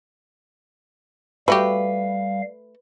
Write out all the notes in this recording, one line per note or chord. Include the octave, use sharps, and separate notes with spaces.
G3 A3 F#4 G4 B4 F5